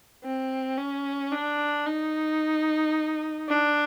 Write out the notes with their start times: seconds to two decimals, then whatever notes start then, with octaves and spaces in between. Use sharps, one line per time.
0.24 C4
0.78 C#4
1.32 D4
1.87 D#4
3.48 D4